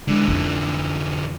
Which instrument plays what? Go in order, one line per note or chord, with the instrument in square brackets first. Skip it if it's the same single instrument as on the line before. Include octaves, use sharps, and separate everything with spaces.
[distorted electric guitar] D3 E3 [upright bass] G#3
[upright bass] F2 F4